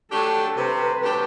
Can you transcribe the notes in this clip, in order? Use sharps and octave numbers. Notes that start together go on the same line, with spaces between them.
F#3 A3 D4 G4 A4
C3 B4
F#3 A3 D4 G4